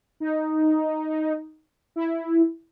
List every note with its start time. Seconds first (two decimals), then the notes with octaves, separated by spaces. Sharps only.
0.20 D#4
1.96 E4